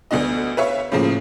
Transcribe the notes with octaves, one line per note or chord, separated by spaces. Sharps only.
D2 B3 D4 D#5
B4 C#5 E5 F5
A2 C#3 F3 A#3